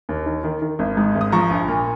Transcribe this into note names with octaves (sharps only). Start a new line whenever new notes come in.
D#2
D#3
D#3
D#3
G#1
G#2
G#1
D#6
F3 A#5 C#6
A#1
A#2